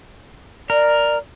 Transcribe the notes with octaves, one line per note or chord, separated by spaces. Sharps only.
A#4 D5